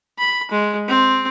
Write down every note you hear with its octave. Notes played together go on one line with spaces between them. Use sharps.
B5
G#3
C4